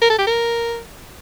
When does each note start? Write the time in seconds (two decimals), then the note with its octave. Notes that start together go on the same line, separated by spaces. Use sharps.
0.01 A#4
0.10 A4
0.18 G4
0.27 A#4